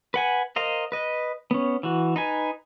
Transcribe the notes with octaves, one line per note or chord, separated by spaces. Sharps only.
B4 F#5 G#5
A#4 C5 D#5 F5
B4 D#5
B3 C#4
E3 F#4
D#4 B4 G#5